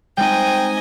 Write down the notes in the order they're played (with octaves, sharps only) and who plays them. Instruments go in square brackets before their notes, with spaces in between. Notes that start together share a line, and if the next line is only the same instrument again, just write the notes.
[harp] G#3 C4 D#4 [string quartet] D#5 G#5 [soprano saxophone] G5